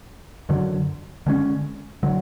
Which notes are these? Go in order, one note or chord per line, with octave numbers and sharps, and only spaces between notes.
F#2 D3 F#3
D3 G#3 C#4
D3 F#3